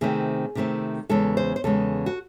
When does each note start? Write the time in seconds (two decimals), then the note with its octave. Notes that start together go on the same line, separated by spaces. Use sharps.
0.01 C3 D#3 A3 C4 G#4
0.55 C3 D#3 A3 C4
1.09 E2 C#3 G#3 A4
1.37 C5
1.56 C5
1.64 E2 C#3 G#3 A4
2.06 F#4